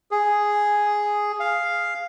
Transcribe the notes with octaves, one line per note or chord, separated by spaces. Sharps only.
G#4
F5